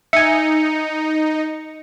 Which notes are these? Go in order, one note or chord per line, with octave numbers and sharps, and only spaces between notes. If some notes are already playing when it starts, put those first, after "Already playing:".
D#4 E5 G#5 C#7